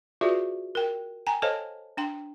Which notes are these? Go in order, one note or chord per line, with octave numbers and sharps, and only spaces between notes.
F4 F#4 G#4 B4 D5 E5
A#4 G5
G5 G#5 A#5
A4 C5 C#5 D#5 F5 A5
D4 G5 C6